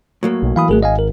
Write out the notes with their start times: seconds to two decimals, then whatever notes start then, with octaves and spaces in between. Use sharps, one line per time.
0.23 A2 F#3 A#3
0.43 B1
0.56 E3 F5 B5 D#6
0.69 G#1 A3 G#4 A#4
0.83 D#5 F5 G#5
0.99 A#4